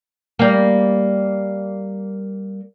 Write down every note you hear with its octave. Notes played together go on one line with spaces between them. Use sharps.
G3 A#3